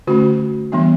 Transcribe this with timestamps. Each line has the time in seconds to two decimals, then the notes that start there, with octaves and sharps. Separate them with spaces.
0.07 D3 A3 C#4 F#4
0.72 E3 G3 B3 D4